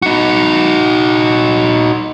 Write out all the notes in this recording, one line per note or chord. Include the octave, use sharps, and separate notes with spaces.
D#4 F#4